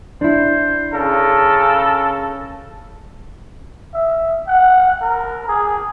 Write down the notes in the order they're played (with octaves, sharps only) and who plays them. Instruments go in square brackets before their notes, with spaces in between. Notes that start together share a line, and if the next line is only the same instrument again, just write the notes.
[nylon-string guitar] D4 E4 [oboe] C5
[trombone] C#3 [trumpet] A4 [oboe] A#4
[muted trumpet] E5
F#5
A#4
G#4